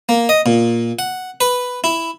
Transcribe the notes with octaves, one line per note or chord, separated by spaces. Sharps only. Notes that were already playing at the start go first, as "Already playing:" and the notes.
A#3
D#5
A#2
F#5
B4
E4